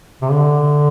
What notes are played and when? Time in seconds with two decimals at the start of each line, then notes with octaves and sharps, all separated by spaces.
0.22 C3
0.30 D3